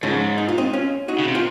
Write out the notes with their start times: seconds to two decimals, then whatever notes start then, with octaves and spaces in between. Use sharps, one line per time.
0.03 G#2 C#3 F3
0.38 D#4
0.48 F4
0.58 C4 D#4
0.73 C#4 F4
1.08 D#4 F#4
1.19 C#3
1.28 C3
1.35 F4